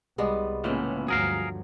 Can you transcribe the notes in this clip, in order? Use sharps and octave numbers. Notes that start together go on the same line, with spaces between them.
C2 G3 G#3 B3
C#2 A2 E3 A#3 B3 C#4 F4 G5
D2 G2 F3 F#3 G#4 A#4 F5